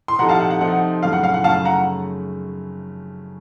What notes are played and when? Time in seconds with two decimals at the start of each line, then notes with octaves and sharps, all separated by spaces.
0.08 C6
0.19 C3 F3 C4 D#4 A4 F#5 A#5
0.29 F5 A5
0.40 F#5
0.50 F#5
0.61 C3 F3 C4 D#4 A4 F#5
1.03 F#2 C#3 A3 F5
1.13 F#5
1.23 F5
1.34 F#5
1.44 F#2 C#3 A3 F5 A5
1.65 F#5 A#5